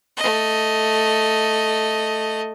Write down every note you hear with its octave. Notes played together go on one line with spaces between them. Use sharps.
A3 D#5